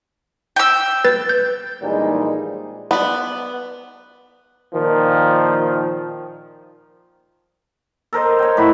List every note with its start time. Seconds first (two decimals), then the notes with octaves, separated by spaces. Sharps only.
0.56 G5 E6
1.05 B4 A6
1.29 G6
1.81 A#1 A#2 E3 G3 G#3 D#4
2.91 B3 D5
4.73 A#2 D#3 F3
8.13 A4 A#4 C5 D#5
8.39 C#5 G5
8.57 A2 F#4 B5 C#6